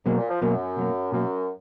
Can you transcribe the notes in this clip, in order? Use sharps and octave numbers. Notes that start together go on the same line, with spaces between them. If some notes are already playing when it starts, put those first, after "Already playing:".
G#2 B2 F#3 A#3
A#2
F3
F#2 B2 F#3 A#3
B2 F#3 A#3
F#2 B2 F#3 A#3